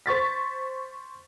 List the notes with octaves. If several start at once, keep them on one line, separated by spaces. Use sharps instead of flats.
C5 C#6 A6 B6